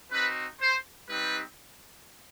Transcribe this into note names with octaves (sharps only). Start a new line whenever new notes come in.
C4 D#4 F#4 B4
C5
G3 C4 D#4 G4 B4